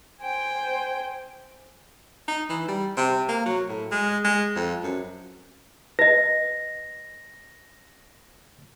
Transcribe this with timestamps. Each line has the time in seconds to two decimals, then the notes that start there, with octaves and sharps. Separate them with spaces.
0.21 C5 G5 G#5
2.28 D#4
2.50 E3
2.68 G3
2.97 C3
3.29 A#3
3.46 F#3
3.69 A2
3.92 G#3
4.24 G#3
4.56 F2
4.84 F#2
5.99 B4 D#5 A#6